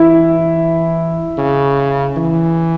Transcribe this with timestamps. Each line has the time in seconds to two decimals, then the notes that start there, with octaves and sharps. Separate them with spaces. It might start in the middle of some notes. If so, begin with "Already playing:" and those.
Already playing: E3 E4
1.38 C#3
2.17 E3